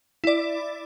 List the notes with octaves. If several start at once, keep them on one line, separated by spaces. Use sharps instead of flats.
E4 D5